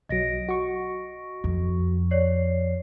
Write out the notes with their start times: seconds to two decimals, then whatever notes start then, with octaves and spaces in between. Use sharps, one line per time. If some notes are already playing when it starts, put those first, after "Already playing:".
0.09 B1 F#3 D#5 A#6 D7
0.49 F#4 C#6
1.44 F2
2.11 C#5 D5 C7